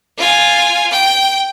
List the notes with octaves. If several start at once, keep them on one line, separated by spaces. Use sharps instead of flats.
F4 G#5
G5